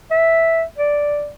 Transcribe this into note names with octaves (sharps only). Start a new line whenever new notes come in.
E5
D5